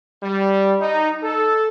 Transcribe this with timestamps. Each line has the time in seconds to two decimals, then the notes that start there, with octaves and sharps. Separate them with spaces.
0.23 G3
0.80 D#4
1.23 A4